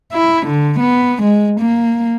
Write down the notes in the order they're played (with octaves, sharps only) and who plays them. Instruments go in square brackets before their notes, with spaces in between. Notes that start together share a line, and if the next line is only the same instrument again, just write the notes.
[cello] E4
D3
B3
G#3
A#3